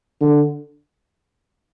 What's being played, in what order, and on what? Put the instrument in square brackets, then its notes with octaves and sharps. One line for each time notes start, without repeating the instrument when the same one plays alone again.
[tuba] D3